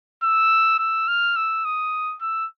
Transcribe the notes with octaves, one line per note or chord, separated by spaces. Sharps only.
E6
E6
F6
E6
D#6
E6